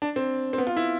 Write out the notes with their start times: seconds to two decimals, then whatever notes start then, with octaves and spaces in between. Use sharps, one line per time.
0.02 D4
0.16 C4
0.53 C4
0.58 B3
0.67 F4
0.77 E4